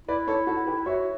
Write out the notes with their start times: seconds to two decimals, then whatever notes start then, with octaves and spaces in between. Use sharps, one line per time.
0.08 E4 B4 D5
0.28 A4 C#5
0.47 F#4 A4
0.67 G4 B4
0.86 F#4 C#5 E5